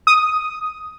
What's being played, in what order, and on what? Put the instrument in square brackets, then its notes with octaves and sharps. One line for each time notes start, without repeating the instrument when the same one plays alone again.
[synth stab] D#6